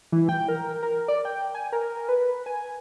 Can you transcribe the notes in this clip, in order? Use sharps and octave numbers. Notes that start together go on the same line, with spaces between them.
E3
G5
A#4
A#4
D5
G5
G#5
A#4
B4
G#5